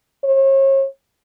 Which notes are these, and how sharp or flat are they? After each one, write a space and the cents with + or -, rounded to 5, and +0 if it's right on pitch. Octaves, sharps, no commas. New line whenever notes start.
C#5 -40